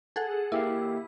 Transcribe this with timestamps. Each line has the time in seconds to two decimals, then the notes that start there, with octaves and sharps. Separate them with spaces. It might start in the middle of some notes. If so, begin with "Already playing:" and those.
0.16 G#4 A4 F#5
0.52 A#3 E4 G4 F5